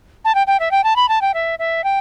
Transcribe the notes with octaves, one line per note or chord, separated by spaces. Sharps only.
A5
G5
G5
E5
G5
A5
B5
A5
G5
E5
E5
G5